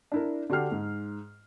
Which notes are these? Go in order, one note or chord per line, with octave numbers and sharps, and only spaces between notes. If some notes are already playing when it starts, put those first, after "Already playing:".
D4 E4 A#4
D3 F#4 G4 G5 F6 C7
G#2